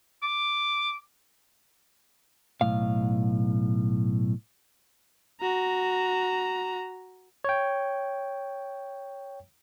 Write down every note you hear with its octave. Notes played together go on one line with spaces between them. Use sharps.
D6
B1 A2 F5
F#4 A#5
C#5 G5